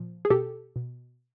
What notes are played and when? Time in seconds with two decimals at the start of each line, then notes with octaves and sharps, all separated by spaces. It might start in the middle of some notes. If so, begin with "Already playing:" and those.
Already playing: A#2 F3
0.25 G#4
0.30 B2 G4 A4
0.76 B2